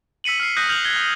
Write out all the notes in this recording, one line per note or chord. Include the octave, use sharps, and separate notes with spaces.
E6 B6 C#7 D#7 F#7
F6 C7
D#6 F#6 G6 A#6 B6 D#7
F6 G6 F7 F#7
G#6 G7
F#6